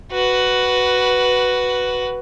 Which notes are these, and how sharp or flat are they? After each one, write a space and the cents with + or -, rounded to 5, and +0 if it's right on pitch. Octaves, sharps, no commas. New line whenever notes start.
F#4 +5 B4 +0